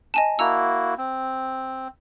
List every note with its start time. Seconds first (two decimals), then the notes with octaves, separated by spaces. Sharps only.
0.14 D#5 G#5 A5
0.39 A#3 E4 F#4 A#5 E6
0.98 C4